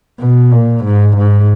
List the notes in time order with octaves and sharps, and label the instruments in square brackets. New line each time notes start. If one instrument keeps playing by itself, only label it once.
[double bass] B2
A#2
G#2
G#2